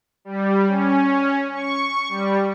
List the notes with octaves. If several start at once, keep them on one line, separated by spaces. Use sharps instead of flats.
G3
C#4
C#6
G3